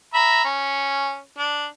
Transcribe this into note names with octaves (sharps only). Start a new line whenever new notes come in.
E5 A#5 B5
C#4
D4